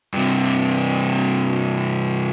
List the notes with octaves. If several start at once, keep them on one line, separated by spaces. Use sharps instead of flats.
G2 C3